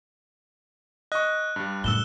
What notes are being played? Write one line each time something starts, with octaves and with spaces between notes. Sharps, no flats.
D#5 C#6 F#6
G2 G3
F#2 A2 E6 E7 G7